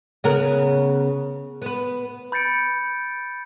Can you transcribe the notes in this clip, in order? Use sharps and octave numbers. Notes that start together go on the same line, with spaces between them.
C#3 B3 A#4
B3 B4
B5 G6 A6 C#7 D7